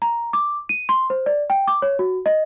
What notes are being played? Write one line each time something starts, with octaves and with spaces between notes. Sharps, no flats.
A#5
D6
D#7
C6
C5
D5
G5
D6
C#5
F#4
D#5